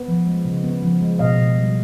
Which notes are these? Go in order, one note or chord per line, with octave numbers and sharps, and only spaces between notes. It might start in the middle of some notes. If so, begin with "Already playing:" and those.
Already playing: B3
F3
G#3
C#3
B3
F3
G#3
B2 D#5 F5
B2
G3